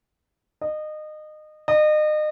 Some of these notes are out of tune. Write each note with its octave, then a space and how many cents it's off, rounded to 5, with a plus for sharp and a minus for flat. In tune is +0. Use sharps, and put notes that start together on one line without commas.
D#5 -25
D#5 -35